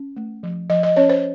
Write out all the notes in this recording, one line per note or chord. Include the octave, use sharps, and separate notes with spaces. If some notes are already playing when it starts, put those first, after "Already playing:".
Already playing: C#4
A3
F3
F3 D#5
D#5
C#4 C#5
C5